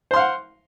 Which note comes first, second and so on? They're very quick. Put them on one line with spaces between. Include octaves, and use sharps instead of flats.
C5 C6 F5 F#5